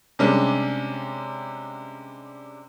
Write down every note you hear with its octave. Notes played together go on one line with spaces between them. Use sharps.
C3 G3 G#3 C#4 D4